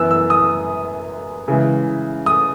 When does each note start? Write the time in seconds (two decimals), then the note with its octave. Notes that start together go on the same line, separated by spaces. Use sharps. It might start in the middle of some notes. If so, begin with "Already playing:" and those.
Already playing: F#2 E3 B3 E6
0.11 E6
0.30 D#6
1.48 C#3 E3 G#3
2.26 D#6